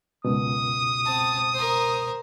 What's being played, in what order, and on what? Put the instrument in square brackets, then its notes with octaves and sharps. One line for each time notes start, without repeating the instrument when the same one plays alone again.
[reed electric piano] C#2 F#2 B2 [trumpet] D#6
[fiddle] C4 A5
A#4 C5